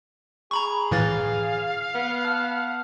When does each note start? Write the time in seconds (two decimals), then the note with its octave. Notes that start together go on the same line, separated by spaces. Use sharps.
0.51 G#4 A#5 B5 C#6
0.91 A2 E3 F5 A6
1.95 B3
2.25 A5 F6